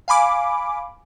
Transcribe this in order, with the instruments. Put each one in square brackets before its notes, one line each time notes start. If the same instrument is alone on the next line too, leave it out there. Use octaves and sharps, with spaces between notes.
[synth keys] F5 G#5 B5 D6